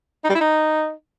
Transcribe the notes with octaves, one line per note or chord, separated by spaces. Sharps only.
D#4
G3
E4
D#4